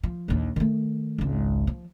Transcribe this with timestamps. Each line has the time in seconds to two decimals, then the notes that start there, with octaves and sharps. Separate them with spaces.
0.03 F3
0.28 A#1 D#2
0.56 D#3 A3
1.18 G#1 C#2
1.67 F3